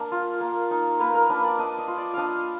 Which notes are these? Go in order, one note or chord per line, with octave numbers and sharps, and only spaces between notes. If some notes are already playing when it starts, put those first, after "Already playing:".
Already playing: A#3 D4 D5 F5
F4
A#3
D#4
A#3 B4
A#4
D4 B4
D5
D4 D#5
D#5
F4
D5
D4 D#5 F5